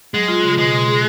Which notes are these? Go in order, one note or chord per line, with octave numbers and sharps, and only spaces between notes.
F#3 G#3
F4
C#3
B2 G#3
B2
G#4